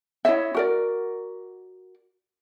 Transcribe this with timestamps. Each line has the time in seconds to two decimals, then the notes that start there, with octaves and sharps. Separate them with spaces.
0.25 E4 C#5 D#5 E5
0.54 F#4 A#4 D5